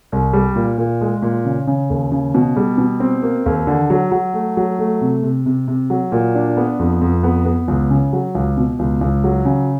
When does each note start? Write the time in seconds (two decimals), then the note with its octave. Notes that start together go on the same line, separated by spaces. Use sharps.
0.12 C2
0.33 G3
0.56 A#2
0.78 A#2
1.01 G#3
1.22 A#2
1.45 C#3
1.67 C#3
1.90 D#2
2.12 C#3
2.35 B2
2.57 G3
2.78 B2
3.00 C4
3.22 A#3
3.46 D#2
3.67 D3
3.90 F#3
4.12 F#3
4.34 A3
4.57 F#3
4.79 A3
5.01 C3
5.23 C3
5.46 C3
5.68 C3
5.90 F#3
6.12 A#2
6.35 D4
6.57 B3
6.79 F2
7.01 F2
7.23 B3
7.45 B3
7.68 C#2
7.90 C#3
8.13 F#3
8.35 C#2
8.57 B2
8.79 C#2
9.01 C#2
9.24 F#3
9.45 C#3